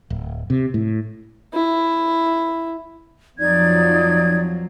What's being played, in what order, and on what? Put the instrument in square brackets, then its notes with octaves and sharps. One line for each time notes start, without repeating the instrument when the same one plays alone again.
[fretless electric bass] D1
C3
A2
[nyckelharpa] E4
[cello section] F2 F3 F#3 [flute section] D#4 D5 G#6